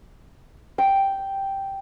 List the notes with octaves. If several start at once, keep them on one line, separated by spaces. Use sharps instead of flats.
G5